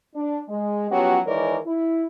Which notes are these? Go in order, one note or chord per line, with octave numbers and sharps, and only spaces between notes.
D4
G#3
F3 F#3 B3 C#4 F#4 G4
D#3 E3 G#3 A#4 C#5 D5
E4